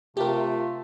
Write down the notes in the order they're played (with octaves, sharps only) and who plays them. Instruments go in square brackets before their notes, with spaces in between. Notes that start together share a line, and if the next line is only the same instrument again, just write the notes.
[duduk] C3 [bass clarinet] A3 [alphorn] F4 [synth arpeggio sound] G4 A#4